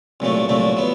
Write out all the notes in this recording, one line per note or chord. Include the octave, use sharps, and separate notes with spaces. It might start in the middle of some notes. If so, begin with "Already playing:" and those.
C2 A#2 F#3 A3
C2 A#2 F#3 A3
F#3 B3